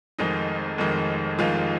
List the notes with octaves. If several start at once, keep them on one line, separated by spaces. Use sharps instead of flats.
F1 F2 D#3 G#3 D#4
F1 F2 D#3 G#3
F1 F2 D#3 G#3 F4